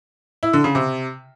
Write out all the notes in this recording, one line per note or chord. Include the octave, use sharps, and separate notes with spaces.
E4
D3
C#3
C3